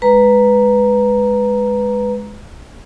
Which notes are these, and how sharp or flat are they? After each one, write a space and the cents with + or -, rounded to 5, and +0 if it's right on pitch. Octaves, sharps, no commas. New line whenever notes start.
G#3 +0 B4 +0 A#5 +0